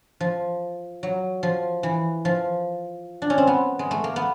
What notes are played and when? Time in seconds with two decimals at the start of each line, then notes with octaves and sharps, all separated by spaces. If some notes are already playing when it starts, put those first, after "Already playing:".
0.20 F3
1.03 F#3
1.43 F3
1.83 E3
2.25 F3
3.22 D4
3.30 C#4
3.38 C4
3.47 B3
3.79 G#3
3.91 A3
4.04 A#3
4.16 B3